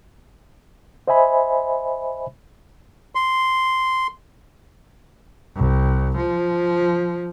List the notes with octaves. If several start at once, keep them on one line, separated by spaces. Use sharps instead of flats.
C5 D#5 E5 G#5 B5
C6
C2
F3